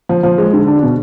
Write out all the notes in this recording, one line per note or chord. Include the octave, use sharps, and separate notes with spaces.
F3
F3
G#3
D3
D4
B2